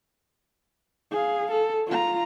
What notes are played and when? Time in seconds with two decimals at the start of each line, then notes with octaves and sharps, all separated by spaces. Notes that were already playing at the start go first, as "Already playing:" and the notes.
1.11 G#4 F5
1.51 A4
1.87 F4 A#5